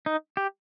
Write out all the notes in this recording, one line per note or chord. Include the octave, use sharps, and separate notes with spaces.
D#4
G4